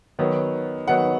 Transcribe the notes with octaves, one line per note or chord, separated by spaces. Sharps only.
D#3 F#3 B3
D#3 F#3 B3 F#5